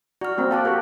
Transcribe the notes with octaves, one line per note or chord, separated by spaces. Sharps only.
F#4 D5 F6
A#3 C4 F#4
A4 D5 F5 A5 F#6
F#4 G4 A#4